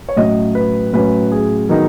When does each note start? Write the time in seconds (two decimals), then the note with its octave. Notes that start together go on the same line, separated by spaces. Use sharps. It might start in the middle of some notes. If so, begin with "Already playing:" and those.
0.09 C#5
0.16 A2 F#3 C#4 D#5
0.55 B4
0.93 A2 F#3 C#4 B4
1.32 G#4
1.69 D#3 F#3 B3 D#4